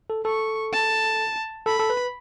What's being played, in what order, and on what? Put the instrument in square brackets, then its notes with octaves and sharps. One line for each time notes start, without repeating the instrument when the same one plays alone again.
[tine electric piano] A4
[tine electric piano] A4 [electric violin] C#6
[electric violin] A5
[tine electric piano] A4 [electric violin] B5
[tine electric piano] A4
B4